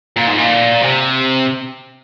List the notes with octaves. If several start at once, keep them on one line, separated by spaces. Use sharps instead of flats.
A#2
G#2
A#2
C3